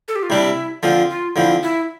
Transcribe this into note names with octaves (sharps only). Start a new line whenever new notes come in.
A4
G4
F4
C3 G3 D4 E4
D3 F3 C4 F4
F4
D3 F3 C4 E4
E4